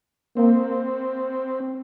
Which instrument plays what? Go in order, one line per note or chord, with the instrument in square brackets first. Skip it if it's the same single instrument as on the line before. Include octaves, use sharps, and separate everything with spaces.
[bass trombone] A#3 [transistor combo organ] C4